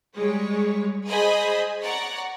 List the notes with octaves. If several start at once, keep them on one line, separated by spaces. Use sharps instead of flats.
G3 G#3 C#5
G#4 C5 D#5 G#5 B5 D#6
C#5 D5 F#5 A#5